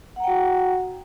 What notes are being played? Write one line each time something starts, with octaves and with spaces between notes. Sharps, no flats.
F#4 F#5 G5 A#5